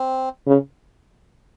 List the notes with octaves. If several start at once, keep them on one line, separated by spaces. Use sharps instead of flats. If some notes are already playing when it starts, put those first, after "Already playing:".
Already playing: C4
C#3